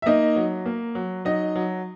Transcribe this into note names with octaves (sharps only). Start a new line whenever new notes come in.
E5
A#3 D#4 D#5
F#3
A#3
F#3
F#3 D#4 D#5
F#3